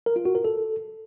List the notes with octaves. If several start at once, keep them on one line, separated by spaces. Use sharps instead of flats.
A#4
F4
F#4
A#4
A4